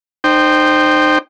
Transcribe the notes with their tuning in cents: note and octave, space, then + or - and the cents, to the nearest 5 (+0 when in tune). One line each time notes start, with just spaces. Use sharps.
D#4 -35 C5 +0 G5 -5